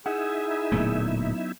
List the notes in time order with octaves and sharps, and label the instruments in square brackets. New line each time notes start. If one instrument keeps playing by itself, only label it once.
[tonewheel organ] D#4 E4 E5 [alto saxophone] G#4 [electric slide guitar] F#5
[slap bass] D1 A#2 A3 [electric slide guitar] F#3 B3 C#4